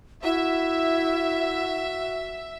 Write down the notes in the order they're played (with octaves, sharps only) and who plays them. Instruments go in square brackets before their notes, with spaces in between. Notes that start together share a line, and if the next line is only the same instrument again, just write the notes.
[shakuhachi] E4 [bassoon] F#4 [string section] E5